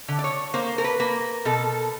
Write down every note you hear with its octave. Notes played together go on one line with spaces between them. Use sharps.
D3
D5
C#5
A#3 C5
A#4
B4
A#3
B2 A4